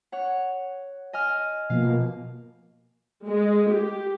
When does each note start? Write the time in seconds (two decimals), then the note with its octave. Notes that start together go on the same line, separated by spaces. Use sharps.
0.12 C#5 F#5
1.13 D#5 G#5 F6
1.70 B2 F3 A#3 F5
3.27 G#3
3.73 G4